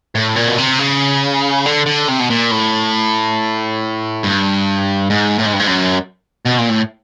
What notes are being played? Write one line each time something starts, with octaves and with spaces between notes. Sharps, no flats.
A2
A#2
B2
C3
C#3
D3
D3
C3
B2
A#2
A2
G2
G#2
A2
G#2
G2
G#2
F#2
B2
A#2
A2